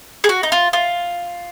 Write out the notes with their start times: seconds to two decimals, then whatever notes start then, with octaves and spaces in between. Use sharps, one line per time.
0.24 G#4
0.29 F#4
0.43 D#4
0.52 F4
0.73 F4